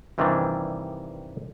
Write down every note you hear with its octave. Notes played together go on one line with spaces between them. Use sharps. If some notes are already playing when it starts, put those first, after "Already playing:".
G2 C3 D#3 E3 G3 D4